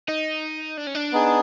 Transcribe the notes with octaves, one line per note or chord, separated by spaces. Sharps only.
D#4
D4
C#4
D4
B3 D#4 G#4